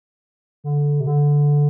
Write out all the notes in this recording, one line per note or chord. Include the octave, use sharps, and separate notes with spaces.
D3
C3
D3